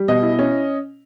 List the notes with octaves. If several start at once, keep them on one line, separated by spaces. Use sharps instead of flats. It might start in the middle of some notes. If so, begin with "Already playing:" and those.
Already playing: G3
B2 D#5
E4
C#4